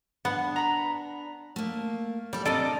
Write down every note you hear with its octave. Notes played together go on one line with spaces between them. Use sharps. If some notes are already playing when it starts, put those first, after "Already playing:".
B3 D4 F#5
A#5 B5
A3 A#3
G3 A4 D5
C3 D4 A4 A#4 D5 D#5